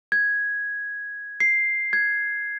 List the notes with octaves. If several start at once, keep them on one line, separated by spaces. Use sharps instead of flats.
G#6
C7
G#6